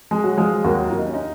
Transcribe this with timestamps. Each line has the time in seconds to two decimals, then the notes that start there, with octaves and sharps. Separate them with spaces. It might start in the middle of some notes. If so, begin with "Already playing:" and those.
0.11 G#3
0.24 F#3 F#4
0.38 F3 G#3 F4
0.64 D#2 F#3 F#4
0.90 D#2 F4
0.98 D#4
1.07 C#4
1.14 D#4